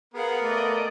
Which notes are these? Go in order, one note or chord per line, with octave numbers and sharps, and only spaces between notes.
B3 G#4 A#4 F5 F#5
A3 D5 D#5